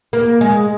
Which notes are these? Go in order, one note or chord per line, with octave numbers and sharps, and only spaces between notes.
A#3
G#3